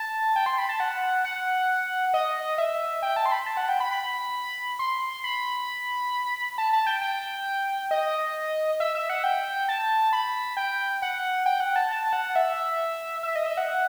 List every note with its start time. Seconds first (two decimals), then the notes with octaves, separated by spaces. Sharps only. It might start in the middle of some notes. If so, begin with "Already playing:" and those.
Already playing: A5
0.36 G5
0.46 C6
0.58 B5
0.69 A5
0.80 F#5
1.24 F#5
2.14 D#5
2.58 E5
3.02 G5
3.16 A5
3.26 C6
3.32 B5
3.46 A5
3.57 F#5
3.69 G5
3.80 B5
3.91 B5
4.79 C6
5.24 B5
6.58 A5
6.73 A5
6.87 G5
7.01 G5
7.91 D#5
8.80 E5
8.95 E5
9.10 F#5
9.24 G5
9.68 A5
10.13 B5
10.57 G5
11.02 F#5
11.46 G5
11.60 F#5
11.76 A5
11.91 A5
12.13 F#5
12.36 E5
13.23 E5
13.36 D#5
13.46 E5
13.57 F#5